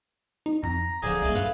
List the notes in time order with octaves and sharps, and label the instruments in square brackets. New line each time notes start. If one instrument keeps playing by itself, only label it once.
[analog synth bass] D#4
[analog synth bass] F2 [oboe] A#5
[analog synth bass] D1 [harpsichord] D3 F3 [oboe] G#4
[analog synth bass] C2 [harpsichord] G#2 A3 A#3
[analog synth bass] G2 [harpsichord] F4 A4 B4